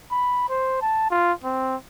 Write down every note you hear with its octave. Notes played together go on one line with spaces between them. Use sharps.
B5
C5
A5
F4
C4